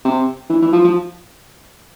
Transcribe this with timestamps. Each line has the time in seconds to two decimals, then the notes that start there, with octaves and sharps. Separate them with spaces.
0.05 C3
0.50 E3
0.62 E3
0.72 F3
0.84 F3